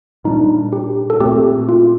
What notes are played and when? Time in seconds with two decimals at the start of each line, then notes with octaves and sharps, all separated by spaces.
0.24 A#2 G3 A#3 D4 D#4
0.73 G4
1.10 A4
1.20 A#2 A3 C4 G4
1.69 F4